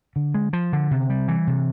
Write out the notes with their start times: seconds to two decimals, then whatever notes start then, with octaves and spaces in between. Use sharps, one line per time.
0.16 D3
0.35 G#3
0.53 F3
0.73 D3
0.91 C3
1.10 G3
1.28 E3
1.47 C3